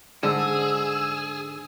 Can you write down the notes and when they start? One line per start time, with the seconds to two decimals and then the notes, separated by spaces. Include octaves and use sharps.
0.23 G#2 D3 G#4 E6